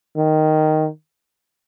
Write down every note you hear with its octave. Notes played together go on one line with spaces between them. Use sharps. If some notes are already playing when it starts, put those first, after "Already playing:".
D#3